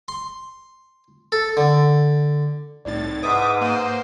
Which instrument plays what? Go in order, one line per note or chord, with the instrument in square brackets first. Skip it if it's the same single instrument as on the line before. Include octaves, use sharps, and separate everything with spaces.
[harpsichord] C6
A4
D3
[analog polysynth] C2 A2 A6 [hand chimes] D#4 D5
[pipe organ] G#2 D#6 [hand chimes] B4 F#5 [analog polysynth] E5 D6
[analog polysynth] A#3 C5